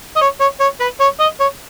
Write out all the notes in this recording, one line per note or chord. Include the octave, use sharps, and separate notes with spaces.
D#5
C#5
C#5
C#5
B4
C#5
D#5
C#5